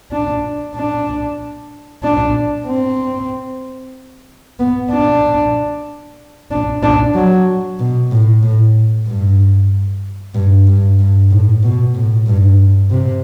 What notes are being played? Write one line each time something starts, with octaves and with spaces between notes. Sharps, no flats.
D4
D4
D4
C4
B3
D4
D4
D4
F#3
B2
A2
A2
G2
G2
G2
G2
A2
B2
A2
G2
C3